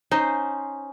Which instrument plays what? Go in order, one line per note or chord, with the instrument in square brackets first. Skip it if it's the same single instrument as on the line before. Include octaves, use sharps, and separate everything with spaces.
[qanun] C#4 C5 [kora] D#4